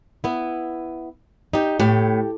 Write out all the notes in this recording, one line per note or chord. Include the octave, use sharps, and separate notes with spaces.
B3 E4
D#4 G4
A2 G4